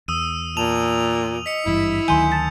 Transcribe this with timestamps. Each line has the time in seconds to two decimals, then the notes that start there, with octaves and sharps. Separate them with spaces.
0.08 E2 D#6 E6 D#7
0.57 A#2 A5 F7
1.46 D#5 B6 C#7
1.66 G#1 G2 E3 E4
2.08 D2 D#3 F#3 G#5 C6 G6
2.31 A5 A6 B6